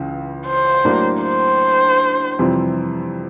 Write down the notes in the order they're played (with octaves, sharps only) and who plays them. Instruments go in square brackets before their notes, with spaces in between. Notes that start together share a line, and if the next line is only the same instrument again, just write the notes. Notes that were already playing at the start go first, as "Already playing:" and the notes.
Already playing: [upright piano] C#2 C#3 E3
[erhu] C5
[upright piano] A2 F#3 A#3 D4
[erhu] C5
[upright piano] F2 C3 E3 G3 C4